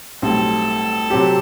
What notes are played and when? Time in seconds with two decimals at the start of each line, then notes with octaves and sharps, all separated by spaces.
0.22 B1 A2 G3 C4 A4
1.10 C3 F#3 C4 G4